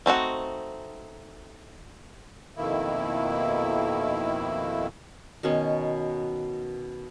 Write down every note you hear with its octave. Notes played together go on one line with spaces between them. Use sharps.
A3 C4 D#4 F#4
F2 B2 D#3 A#3 E4
B2 D#3 C#4 B5